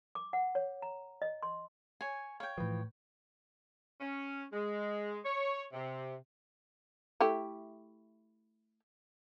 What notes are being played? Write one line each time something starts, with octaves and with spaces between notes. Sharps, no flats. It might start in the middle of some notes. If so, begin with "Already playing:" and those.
D6
F#5
C#5
A#5
D#5
C6
C#5 G#5
C#5 F5 G5
A2 E3 F3 B4
C#4
G#3
C#5
C3
A3 E4 G4